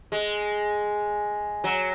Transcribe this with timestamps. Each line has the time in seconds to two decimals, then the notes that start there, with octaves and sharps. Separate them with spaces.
0.12 G#3
1.64 F#3